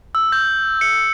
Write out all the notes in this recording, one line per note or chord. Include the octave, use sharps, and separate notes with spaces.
E6
G6
C#7